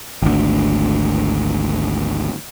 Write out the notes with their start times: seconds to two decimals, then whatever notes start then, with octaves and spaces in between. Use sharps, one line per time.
0.22 G#1 D2